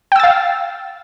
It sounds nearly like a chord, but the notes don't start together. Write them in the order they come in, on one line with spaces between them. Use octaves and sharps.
G5 E6 A6 F5